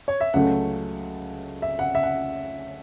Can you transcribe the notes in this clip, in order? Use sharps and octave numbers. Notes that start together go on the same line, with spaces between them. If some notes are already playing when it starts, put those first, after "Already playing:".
C#5
E5
C#2 C#3 F#3 A3 F#5
E5
F#5
E5
F#5